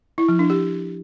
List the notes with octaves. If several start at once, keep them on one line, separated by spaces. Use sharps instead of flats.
E4
F3
D4
G4